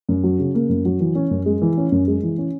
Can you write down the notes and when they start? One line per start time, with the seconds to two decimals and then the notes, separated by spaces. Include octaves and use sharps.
0.09 F#2
0.24 F#3
0.39 C#3
0.55 A#3
0.69 F#2
0.85 F#3
1.00 E3
1.15 C#4
1.31 F#2
1.46 G#3
1.62 E3
1.78 C#4
1.92 F#2
2.08 G#3
2.23 E3
2.38 C#4